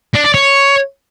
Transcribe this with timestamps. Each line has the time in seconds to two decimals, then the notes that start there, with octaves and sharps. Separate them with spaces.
0.14 D4
0.24 D5
0.34 C#5